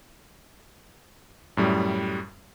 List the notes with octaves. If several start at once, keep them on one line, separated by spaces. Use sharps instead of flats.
F#2 A2 G3